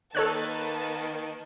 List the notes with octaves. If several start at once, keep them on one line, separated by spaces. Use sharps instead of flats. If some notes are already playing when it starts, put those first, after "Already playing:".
D#3 A#3 A4 B4 C#5 A5 F#6